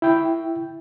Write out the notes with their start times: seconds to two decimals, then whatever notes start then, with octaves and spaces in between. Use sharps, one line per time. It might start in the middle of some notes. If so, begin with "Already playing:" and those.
0.02 E4 G5